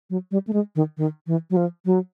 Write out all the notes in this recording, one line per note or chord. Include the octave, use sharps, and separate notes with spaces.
F#3
G3
A3
G#3
D#3
D#3
E3
F#3
F3
F#3